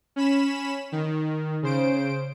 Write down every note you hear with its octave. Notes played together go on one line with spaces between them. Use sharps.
C#4 B5 E7
D#3
C#3 C5 D7